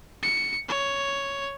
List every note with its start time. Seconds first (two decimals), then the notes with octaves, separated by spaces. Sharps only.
0.23 C#7
0.69 C#5